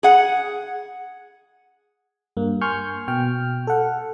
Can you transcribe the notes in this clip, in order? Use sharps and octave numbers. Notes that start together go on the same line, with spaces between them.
G#4 F#5
G2 A#3
G#5 C6 C#6 F6 G6
B2 G5 F6
A4 F#5